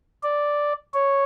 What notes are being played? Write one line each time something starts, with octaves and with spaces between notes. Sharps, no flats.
D5
C#5